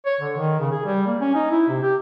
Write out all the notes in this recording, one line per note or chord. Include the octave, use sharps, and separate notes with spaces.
C#5
D3
D#3
C#3
G#4
G3
A#3
C#4
D#4
E4
C3
G4